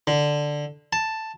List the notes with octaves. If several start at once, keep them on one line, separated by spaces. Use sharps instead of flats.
D3
A5